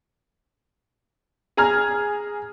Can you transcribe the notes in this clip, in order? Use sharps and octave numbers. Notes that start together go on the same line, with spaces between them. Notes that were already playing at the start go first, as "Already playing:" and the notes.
G#4 G#5 A#5 F6 G#6